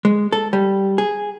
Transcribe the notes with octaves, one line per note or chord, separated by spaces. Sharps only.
G#3
A4
G3
G#4